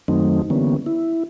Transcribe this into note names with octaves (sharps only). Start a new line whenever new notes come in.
F#2 D#3 F#3 A3 C4 D#4
D3 E3 G3 A#3 B3 C#4
E4